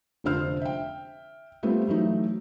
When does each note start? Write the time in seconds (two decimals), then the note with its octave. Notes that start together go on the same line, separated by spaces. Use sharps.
0.24 F1 D3 F3 D4 C5 F6
0.61 E5 G5
1.63 G3 A3 B3 C4 F4
1.87 E3 F#3 A3 D#4